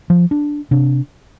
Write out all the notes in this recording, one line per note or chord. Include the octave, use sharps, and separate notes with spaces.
F3
D4
C3 D4